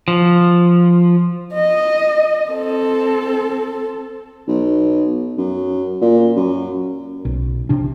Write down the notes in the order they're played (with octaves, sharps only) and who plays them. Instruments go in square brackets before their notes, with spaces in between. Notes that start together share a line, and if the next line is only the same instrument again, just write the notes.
[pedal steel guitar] F3
[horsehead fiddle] D#5
C4 A4
[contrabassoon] B1
F#2
A#2
F#2
[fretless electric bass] B1
C3 D4